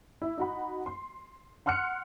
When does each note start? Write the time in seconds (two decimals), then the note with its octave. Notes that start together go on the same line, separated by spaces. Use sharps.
0.22 E4
0.38 D#4 F#4 B5
0.86 C6
1.66 F#5 C6 F6 F#6 C#7